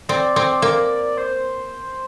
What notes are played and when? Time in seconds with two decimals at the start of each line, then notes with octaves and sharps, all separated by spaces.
0.09 C4 D5
0.36 C4
0.62 A#3
1.17 C5